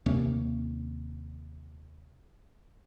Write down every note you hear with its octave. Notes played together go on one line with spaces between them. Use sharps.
D#2 C3 A#3 C#4